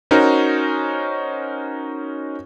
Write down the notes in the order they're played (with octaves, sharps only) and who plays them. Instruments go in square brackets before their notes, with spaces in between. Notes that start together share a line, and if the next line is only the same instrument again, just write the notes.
[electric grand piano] C#4 D#4 F#4 A#4 C5